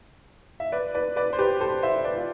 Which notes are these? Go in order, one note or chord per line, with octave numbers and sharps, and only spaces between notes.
E5
B4 D5
B4 D5
B4 D5
C5
G4 B4
A4 C5
C5 E5
B4 D5
F4